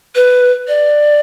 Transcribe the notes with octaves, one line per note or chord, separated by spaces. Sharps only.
B4
D5